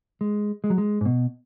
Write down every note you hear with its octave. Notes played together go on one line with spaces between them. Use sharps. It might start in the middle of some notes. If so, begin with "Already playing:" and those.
G#3
G#3
F#3
G#3
G#2
B2